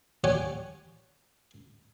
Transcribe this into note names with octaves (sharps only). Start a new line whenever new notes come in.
G4 C#5 D5 F#5 G#5